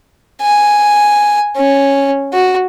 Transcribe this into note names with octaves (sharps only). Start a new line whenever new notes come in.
G#5
C#4
F#4